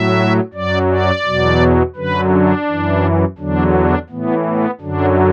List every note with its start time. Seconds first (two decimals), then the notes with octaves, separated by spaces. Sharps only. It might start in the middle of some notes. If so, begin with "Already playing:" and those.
Already playing: A2 F#3 E5
0.54 F#2 F#3 D5
0.89 D5
1.25 E2 B2 F#3
1.96 F#2 D3 F#3 B4
2.32 D4
2.68 F#2 E3
3.38 E2 D3 F#3 D4
3.74 D4
4.09 A2 E3 B3
4.46 B3
4.81 F#2 D3 F#3 D4